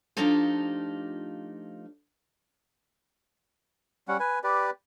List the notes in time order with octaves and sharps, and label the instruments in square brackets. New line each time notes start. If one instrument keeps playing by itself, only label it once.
[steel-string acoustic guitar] F3 A3 D4 D#4 F4 G4
[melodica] G3 C#4 F#5
B4 G#5
G4 B4 D5